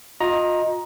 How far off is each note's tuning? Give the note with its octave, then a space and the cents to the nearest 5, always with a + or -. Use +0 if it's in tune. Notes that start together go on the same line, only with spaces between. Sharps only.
F4 +35 D#5 +0 A#5 +15